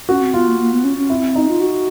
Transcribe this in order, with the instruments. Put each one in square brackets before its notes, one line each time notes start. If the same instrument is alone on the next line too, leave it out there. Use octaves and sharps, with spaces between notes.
[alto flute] C#4 [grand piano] F#4
[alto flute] C4
[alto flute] B3 [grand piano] F4
[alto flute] A#3
A#3
B3
C#4
C#4
[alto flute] C4 [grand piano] E4
[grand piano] D#4
[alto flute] F4
F#4